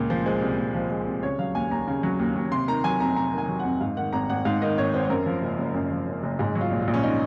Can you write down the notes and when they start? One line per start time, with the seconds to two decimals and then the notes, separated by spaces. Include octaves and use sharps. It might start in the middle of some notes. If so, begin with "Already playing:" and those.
Already playing: C#2 A#2
0.10 F3 C5
0.26 G#3 C5
0.42 C2
0.58 A#2
0.74 F3
0.90 G#3
1.07 C2
1.23 C#3 C#5
1.39 F#3 F5
1.55 D#2 G#5
1.71 D#2 A#5
1.88 C#3
2.03 F#3
2.19 D#2
2.36 D#2
2.52 C3 C6
2.68 D#3 A#5
2.84 F#3 G#5
3.00 F2 A#5
3.16 C3 A#5
3.33 D#3
3.38 G#5
3.48 F#3
3.59 F#5
3.65 F2
3.80 G#2 F5
3.97 D#3 F#5
4.13 G#1 A#5
4.29 G#1 F#5
4.45 G#2 F5
4.62 D#3 D#5
4.78 G#1 C#5
4.94 G#1 C5
5.05 C5
5.10 F#2 A#4
5.26 F3
5.42 F#1
5.58 F#1
5.74 F#2
5.91 F3
6.07 F#1
6.23 F#1
6.39 G#2 G#4
6.55 F#3
6.61 F4
6.71 A#1
6.82 F4
6.87 A#1
6.94 C#4
7.03 D#4